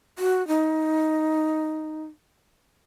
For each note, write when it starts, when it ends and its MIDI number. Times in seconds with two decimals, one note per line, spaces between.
0.19 0.46 66
0.48 2.03 63